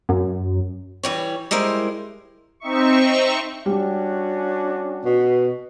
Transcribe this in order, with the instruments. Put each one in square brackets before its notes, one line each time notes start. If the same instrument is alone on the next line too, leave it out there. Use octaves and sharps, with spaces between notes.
[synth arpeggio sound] F#2
[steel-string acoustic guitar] E3 G3 C#5
G3 G#3 E4 A#4 C5
[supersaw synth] C4 D#4 E5 C#6
[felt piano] G3 [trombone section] C#4 D4 F#4
[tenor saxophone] B2